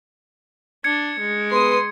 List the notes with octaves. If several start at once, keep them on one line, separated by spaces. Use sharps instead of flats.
D4 G#6 C#7
G#3
B3 G#4 B4 C6 D#6